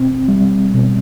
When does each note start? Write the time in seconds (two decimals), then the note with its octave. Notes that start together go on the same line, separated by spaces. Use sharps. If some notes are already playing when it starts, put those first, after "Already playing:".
Already playing: B2 C4
0.28 G3
0.74 B2